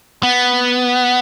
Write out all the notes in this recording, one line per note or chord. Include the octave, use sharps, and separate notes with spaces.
B3